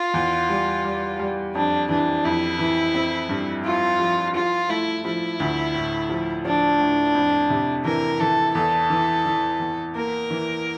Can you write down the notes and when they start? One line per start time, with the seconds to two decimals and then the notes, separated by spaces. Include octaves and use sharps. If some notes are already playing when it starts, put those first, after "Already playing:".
Already playing: F4
0.14 E2
0.49 G3
0.84 G3
1.19 G3
1.55 F2 D4
1.89 E3 D4
2.25 F2 E4
2.59 E3
2.95 C4
3.29 G2
3.64 E4 F4
4.00 F3
4.35 F3 F4
4.69 A3 E4
5.05 F3 E4
5.40 D2
5.74 A2
6.09 F3
6.45 F3 D4
6.80 A2
7.15 F2
7.50 C3
7.85 E3 A#4
8.20 E3 A4
8.55 E2 A4
8.90 E3
9.26 E3
9.60 E2
9.95 A#3 A#4
10.30 E3